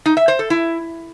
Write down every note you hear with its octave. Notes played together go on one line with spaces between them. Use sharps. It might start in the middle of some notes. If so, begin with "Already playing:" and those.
D#4
E5
C5
A4
E4